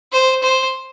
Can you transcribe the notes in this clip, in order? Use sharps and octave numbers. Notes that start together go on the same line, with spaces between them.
C5
C5